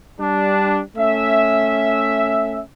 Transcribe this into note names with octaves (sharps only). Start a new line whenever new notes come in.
G3 D4
A3 C#4 E5